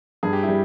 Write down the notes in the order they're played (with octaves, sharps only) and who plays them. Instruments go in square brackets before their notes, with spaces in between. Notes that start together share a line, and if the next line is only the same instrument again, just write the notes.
[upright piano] G2 [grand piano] G#4
[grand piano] G4
E4
[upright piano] G3